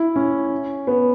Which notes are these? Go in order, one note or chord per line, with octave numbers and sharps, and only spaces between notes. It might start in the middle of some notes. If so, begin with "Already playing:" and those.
Already playing: E4
C#4
B3